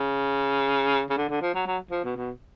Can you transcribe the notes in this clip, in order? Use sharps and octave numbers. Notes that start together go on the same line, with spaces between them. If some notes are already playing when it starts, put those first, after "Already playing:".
Already playing: C#3
C#3
D3
D3
F3
F#3
F#3
F3
B2
B2